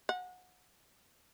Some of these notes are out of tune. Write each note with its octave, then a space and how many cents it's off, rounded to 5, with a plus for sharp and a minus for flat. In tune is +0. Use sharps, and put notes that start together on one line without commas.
F#5 -25